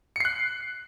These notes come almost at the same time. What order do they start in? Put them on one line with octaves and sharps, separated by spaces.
C#7 C7 F#6